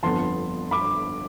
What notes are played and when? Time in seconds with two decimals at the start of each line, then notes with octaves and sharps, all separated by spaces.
0.03 G1 F2 D3 F3 B3 A5 C6
0.71 B5 D6